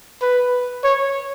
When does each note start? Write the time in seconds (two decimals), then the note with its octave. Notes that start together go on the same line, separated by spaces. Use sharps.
0.22 B4
0.84 C#5